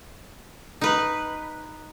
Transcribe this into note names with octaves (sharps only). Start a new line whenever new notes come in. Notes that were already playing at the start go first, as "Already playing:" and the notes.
D#4 B4